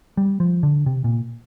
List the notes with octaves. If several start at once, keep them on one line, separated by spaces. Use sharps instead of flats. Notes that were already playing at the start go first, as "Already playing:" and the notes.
G3
F3
D3
C3
A#2